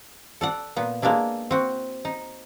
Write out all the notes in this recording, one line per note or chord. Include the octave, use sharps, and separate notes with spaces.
A4 D5 F#5
A#2 B3
G#3 A#3 B3 D4 E4
C4 F#4
D#4